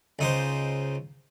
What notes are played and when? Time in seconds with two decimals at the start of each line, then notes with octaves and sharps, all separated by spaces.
0.19 C#2 D#4 C5